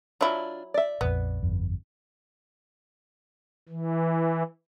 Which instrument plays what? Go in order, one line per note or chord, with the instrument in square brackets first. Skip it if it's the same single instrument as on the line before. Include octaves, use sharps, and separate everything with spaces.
[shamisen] F#3 E4 [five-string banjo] D4 F4
[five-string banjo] D5 E5
[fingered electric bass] A#1 F2 [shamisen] B3
[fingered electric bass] G1 F2
[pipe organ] E3